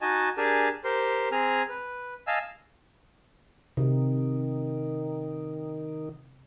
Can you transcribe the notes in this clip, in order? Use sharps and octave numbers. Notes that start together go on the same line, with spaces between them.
D#4 F#4 D#5 G#5 A5
D4 G4 G#4 A#4 G#5 A5
G4 A#4 C5 C6
C4 G#4 G#5 A#5 F6
B4
D#5 F5 G#5 A5 E6
C3 D#3